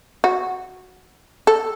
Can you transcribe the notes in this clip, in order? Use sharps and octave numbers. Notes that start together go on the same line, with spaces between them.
F#4
A4